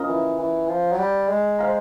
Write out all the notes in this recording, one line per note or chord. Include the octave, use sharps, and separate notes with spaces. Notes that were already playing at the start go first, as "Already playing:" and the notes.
Already playing: C#4 F4 A#4 D#5
E3
E3
F3
F#3
G3
G#3
C5 F5 A#5